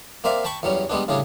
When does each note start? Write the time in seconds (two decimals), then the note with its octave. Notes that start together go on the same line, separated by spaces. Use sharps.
0.24 A#3 C4 D5 E5 F5
0.45 G5 A5 B5 C#6
0.63 E2 F#3 G3 C#4
0.90 G3 G#3 B3 D4
1.08 A2 C#3 G3 D4 G#4